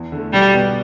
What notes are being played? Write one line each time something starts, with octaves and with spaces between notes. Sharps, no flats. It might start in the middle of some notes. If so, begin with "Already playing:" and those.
Already playing: E2
D3 A3
B1 G3
B2 B3